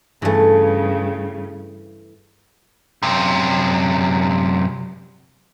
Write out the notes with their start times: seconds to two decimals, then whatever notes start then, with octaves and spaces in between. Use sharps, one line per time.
0.22 G2 C#3 E3 A3
3.03 F#2 C3